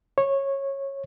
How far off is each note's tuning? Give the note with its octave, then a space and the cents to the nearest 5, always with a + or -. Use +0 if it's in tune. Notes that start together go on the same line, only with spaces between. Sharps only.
C#5 -15